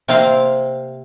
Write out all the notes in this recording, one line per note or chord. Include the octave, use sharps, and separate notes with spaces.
C3 A#3 C4 F5